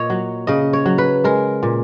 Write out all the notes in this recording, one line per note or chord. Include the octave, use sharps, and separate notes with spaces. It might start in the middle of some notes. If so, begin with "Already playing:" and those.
Already playing: A#2 C#5 D#5
F#3
C#3 D#5
C#5
F#3
B4
G#3 A#4
A#2